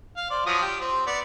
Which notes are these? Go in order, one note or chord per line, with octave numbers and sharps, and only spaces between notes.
F5
C5 D5
F3 F#3 D#6
G4
C4
B3 D5